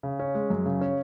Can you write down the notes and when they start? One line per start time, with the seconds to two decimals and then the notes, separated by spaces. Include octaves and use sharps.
0.03 C#3
0.20 C#4
0.35 G#3
0.50 F#2
0.66 C#3
0.81 C#4